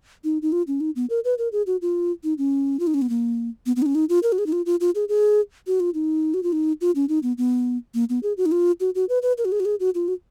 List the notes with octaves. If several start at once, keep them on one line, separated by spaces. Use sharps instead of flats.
D#4
D#4
F4
C#4
D#4
B3
A#4
B4
A#4
G#4
F#4
F4
D#4
C#4
F4
D#4
C#4
B3
A#3
B3
B3
D#4
C#4
D#4
F4
A#4
F#4
G#4
D#4
F4
F4
F4
G#4
G#4
F#4
F4
D#4
F#4
F4
D#4
F4
C#4
D#4
B3
B3
A#3
B3
G#4
F#4
D#4
F4
F#4
F#4
B4
B4
A#4
F#4
G#4
F#4
G#4
F#4
F4
F#4